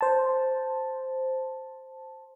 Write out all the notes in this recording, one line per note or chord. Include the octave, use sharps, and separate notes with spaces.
C5 A5